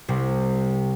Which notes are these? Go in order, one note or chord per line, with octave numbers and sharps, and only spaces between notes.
C2 C3